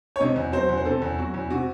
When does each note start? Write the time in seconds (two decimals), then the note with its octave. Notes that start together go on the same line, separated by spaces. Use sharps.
0.16 C#5
0.20 C3 D#5
0.36 E2
0.52 F#3 C5
0.69 E2
0.78 C5
0.85 C3 A4
1.02 E2
1.18 F#3 F#4
1.34 E2
1.50 C3 F#4